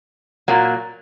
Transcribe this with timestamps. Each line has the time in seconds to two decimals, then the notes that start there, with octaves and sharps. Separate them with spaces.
0.48 A#2 F#3 A#3